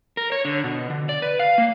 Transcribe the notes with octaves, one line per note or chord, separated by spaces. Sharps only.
A#4
C#5
D3
B2
D3
D5
B4
F5
A#3